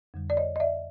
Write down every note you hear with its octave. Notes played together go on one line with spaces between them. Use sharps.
F2 D3 G3
D5
C#5 D#5
D#5
D5 E5